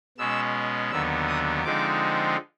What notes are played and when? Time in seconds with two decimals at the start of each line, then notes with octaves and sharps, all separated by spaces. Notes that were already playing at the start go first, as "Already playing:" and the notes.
0.18 B2 G#3 C#4 E6
0.91 D#2 D3 F#3 B3 E6
1.28 D#6
1.64 D3 F3 G#3 C4 D#4 D6